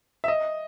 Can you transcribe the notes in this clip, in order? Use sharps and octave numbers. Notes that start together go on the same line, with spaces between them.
E5
D#5